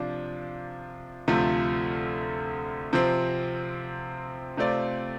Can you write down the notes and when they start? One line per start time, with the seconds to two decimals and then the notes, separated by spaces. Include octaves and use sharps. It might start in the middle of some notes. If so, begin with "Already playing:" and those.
Already playing: C3 F3 D4 F4
1.28 D2 C3 F3 A3 F4
2.93 C3 F3 C4
4.57 C3 A3 C4 F4 D5